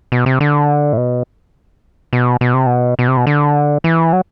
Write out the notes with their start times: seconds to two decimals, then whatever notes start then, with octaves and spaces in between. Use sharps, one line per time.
0.12 B2
0.26 C3
0.41 D3
0.93 A2
0.97 B2
2.13 B2
2.41 B2
2.54 C3
2.66 B2
2.99 B2
3.08 C3
3.17 B2
3.27 D3
3.84 E3
4.13 F#3